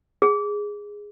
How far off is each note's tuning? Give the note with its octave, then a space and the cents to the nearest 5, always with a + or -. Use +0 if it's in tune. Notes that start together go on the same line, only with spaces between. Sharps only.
G#4 -10